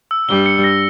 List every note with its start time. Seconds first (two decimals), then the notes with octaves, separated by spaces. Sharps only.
0.11 E6
0.29 G2 G3 G7
0.46 C#7
0.64 A#6